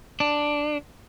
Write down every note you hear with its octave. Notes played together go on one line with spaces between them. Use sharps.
D4